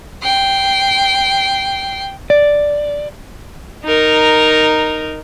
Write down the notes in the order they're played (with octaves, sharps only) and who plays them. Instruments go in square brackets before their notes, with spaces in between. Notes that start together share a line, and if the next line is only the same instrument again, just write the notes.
[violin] G5 C7
[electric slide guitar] D5
[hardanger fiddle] D#4 A#4